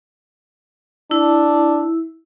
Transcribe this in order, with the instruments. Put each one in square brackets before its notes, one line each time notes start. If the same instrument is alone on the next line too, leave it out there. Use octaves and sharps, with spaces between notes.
[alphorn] D4 [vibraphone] E4